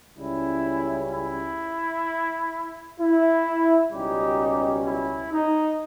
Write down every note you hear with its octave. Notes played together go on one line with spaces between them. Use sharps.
C#2 C#3 G3 C#4 E4
E4
E4
C#2 B2 G3 C#4 D#4 G4
E4
D#4